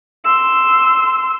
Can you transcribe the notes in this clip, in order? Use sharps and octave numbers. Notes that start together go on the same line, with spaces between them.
C6 E6